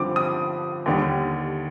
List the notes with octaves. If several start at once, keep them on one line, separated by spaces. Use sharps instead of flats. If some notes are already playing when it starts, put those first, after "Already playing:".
Already playing: G2 D3 F3 C4 D6
D#6
D#2 D3 G3